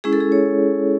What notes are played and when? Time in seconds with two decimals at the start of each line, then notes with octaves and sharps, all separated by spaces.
0.04 G#3 C#4 E4 G#4
0.13 A4
0.20 G#4
0.32 C#5